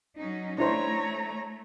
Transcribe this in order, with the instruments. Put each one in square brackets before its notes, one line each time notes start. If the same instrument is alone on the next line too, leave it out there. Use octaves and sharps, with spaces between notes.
[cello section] F#3 C#4 D#4
[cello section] A3 [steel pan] D4 E4 C5 [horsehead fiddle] C#5 A#5